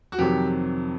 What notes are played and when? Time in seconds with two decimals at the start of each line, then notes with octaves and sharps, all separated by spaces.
0.12 F#4
0.18 F2 C3 D#3 F#3 G4